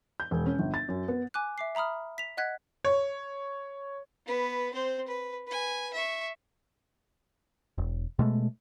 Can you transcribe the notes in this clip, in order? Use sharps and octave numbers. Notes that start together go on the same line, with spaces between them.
G6
E1
C#4
G1
A6
F#2
B3
G#5 D6 F#6
E5 D6 C7
E5 A#5 B5 D#6 F6
B6 F7
D#5 F#5 F#6 G#6 B6
C#5
B3 B4
C4 C5
B4
B4 G#5
E5 C#6
E1
B2 G#3 A3